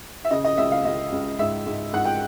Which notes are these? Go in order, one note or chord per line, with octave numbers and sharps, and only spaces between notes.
E5
C#3 D#5
D#5
C#2 E5
F5
C#2 D#5
C#2
G#2 E5
G#2
G#2 F#5
G5